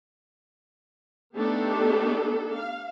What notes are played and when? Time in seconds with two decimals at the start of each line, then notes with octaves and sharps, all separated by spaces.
1.36 A3 B3 D4 D#4 G4 A4
2.55 F5